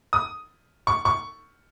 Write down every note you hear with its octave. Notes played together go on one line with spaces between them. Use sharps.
D#6
C#6
C#6